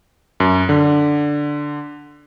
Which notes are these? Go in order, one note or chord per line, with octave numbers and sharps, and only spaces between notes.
F#2
D3